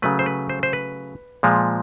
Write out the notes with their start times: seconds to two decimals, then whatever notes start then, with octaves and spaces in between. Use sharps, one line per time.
0.02 C#3 F#3 A3 B4
0.19 C5
0.26 B4
0.49 C5
0.63 C5
0.73 B4
1.43 A#2 F3 G#3